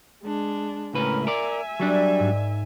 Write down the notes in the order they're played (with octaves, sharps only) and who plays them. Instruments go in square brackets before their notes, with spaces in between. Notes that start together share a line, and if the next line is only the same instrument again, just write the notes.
[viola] G#3 D4
[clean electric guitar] C#2 A2 B4 [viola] C#4 A#4
[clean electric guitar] A#4 D5 [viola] E5 G#5
[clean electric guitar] F#3 G3 D4 [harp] A#4 D5
[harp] G#2